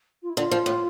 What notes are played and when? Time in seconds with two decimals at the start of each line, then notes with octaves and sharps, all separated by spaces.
0.22 F4
0.30 E4
0.37 D3 F4
0.51 F3
0.66 A2